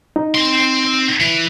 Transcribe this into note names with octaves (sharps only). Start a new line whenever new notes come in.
D#4
C4 C6
E3